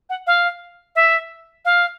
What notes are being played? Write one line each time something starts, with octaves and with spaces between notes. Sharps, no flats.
F#5
F5
E5
F5